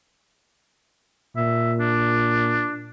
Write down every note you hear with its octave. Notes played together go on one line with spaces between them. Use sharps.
A#2 E5
D4